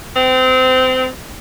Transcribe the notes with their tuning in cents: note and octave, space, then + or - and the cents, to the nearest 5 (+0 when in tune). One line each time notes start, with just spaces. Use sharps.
C4 -25